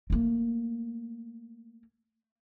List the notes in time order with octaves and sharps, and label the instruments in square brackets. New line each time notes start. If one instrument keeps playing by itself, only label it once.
[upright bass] A3 A#3